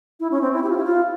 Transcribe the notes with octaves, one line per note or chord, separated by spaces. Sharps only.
E4
C#4
C4
E4
G4
F4
E4
F4